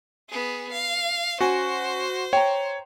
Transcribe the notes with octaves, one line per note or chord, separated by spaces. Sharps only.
B3 G#4
F5
C#4 F#4 C5 G#5
C#5 G5 A#5